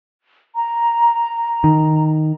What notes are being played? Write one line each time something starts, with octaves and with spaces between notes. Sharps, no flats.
A#5
D#3